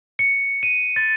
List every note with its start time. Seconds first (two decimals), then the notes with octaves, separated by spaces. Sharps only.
0.19 C#7
0.63 D#7
0.96 A6